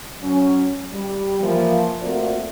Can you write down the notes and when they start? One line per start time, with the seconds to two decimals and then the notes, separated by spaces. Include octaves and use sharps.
0.22 F#3 C#4
0.93 G3
1.41 E3 F3 A#3
2.02 A3 A#3 C4 F4 F#4 D5